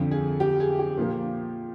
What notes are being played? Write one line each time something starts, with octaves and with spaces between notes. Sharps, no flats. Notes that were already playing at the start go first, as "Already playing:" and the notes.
Already playing: F2 D3 F3
G#4
G4
G#4
G4
A#2 F3 A#3